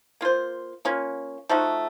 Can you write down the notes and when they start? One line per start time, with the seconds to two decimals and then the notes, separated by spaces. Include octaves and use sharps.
0.21 A#3 F4 C5
0.85 A#3 C#4 F4
1.49 F3 A3 D#4 F#4